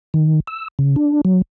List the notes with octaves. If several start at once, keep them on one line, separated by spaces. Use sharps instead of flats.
D#3
E6
C#3
D4
F#3